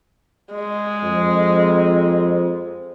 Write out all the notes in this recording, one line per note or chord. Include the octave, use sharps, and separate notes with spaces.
G#3
F2